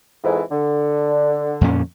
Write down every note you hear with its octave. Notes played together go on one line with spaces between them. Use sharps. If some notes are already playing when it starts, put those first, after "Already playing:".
F2 G#2 E3
D3
F2 A#2 C#4